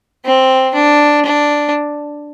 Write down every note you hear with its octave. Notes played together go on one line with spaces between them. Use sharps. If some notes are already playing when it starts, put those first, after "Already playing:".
C4
D4
D4